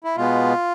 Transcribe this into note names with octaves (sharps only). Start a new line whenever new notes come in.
E4
B2 G#3 B3 F4